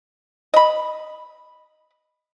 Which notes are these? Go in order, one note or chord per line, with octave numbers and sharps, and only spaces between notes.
D#5 B5